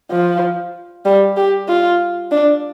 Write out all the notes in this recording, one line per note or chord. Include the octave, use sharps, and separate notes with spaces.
F3
G3
G4
F4
D4